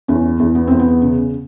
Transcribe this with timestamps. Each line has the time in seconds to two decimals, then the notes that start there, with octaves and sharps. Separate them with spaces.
0.08 E2 C#4
0.39 E2
0.55 B3
0.67 E2 C4
0.79 B3
1.02 C#3